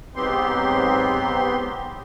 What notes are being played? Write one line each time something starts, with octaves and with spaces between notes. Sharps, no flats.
G#2 F#3 B3 C4 G4 C6